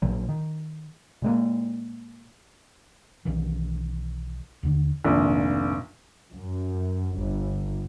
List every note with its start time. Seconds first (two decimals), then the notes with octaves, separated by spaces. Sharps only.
0.02 A#1 A#2 F#3
0.29 D#3
1.22 A#2 G#3 A#3
3.25 B1 D#3 E3
4.63 D#2 D3
5.05 F1 A#1 G#2 D#3 A#3
6.31 F#2
7.17 G1